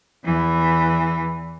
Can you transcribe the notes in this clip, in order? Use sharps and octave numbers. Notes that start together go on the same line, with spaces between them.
E2 E3